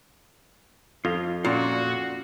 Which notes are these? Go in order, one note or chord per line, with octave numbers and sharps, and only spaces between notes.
F2 F4 F5
A#2 C#4 F4 F#4